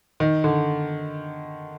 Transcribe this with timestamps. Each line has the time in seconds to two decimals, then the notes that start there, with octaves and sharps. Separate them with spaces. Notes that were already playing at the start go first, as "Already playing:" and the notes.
0.20 D#3
0.44 D3